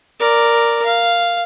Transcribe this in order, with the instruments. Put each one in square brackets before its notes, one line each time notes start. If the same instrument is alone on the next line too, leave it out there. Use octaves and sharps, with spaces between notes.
[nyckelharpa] A#4 D5
F5